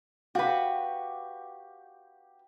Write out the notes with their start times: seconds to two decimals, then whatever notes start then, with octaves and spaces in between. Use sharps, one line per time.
0.35 F#4 G4 B4 F5